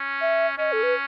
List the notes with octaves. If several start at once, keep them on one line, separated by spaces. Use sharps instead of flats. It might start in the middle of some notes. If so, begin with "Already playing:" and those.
Already playing: C#4
E5
C#4 D#5
A4
B4